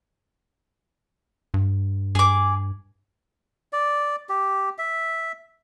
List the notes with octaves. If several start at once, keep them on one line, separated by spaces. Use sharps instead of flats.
G2
G2 G#4 D6
D5
G4
E5